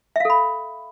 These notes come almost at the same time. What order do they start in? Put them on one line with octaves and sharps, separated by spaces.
E5 F5 A4 B5